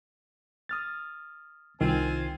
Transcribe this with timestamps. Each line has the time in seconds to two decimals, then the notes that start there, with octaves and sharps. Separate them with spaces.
0.69 D#6 F6 A6
1.81 C2 D#3 C4 F4 G#5